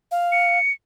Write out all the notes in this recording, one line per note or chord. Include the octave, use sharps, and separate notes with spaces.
F5
C#7